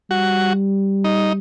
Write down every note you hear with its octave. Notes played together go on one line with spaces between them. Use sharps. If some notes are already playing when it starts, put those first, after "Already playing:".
G3 F#4
D#4